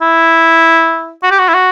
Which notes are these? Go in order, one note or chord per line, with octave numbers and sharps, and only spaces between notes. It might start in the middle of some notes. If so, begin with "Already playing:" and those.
E4
F#4
G4
F#4
E4
F#4